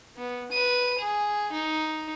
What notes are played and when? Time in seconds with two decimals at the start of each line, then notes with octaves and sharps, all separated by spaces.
0.16 B3
0.52 B4 D#7
0.99 G#4
1.53 D#4